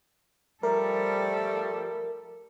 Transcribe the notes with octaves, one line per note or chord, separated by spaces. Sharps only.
F3 G3 A3 A4 A#4